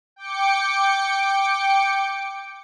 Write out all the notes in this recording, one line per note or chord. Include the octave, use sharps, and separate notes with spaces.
G5 D6 C#7